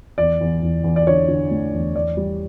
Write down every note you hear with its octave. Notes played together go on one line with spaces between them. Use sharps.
E2 D5
E2
E2
E2
D5
D3 C#5
D3
A3
E2
E2 D5
G3